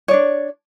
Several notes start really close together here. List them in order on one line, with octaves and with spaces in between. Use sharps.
C#5 D5 D4